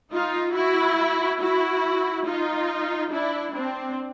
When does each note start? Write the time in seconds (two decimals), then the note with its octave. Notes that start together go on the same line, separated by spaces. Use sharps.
0.13 D#4 F4
0.55 E4 F#4
1.41 E4 F#4
2.26 D#4 F4
3.12 D4 E4
3.55 C4 D4